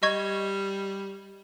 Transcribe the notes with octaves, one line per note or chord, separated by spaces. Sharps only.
G3 D#5 C#6 G#6